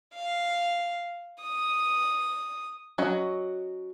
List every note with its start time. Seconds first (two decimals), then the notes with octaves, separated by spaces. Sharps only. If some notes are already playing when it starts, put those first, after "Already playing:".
0.15 F5
1.42 D#6
2.98 F#3 C#4 F#4 D#5